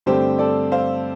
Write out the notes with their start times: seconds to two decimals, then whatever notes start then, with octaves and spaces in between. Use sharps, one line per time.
0.06 G2 D3 A3 C4 G4 C5
0.39 A4 D5
0.72 C5 F5